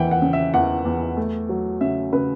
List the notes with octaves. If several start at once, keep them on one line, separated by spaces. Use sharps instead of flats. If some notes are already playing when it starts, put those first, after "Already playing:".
Already playing: E2 E3 E5 F#5 G5
F#5
C#3
E5
E2 F#5
E2
A3
F#3
C#3 E5
C#3 B4